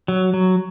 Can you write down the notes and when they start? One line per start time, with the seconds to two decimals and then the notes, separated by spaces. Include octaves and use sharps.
0.08 F#3
0.34 F#3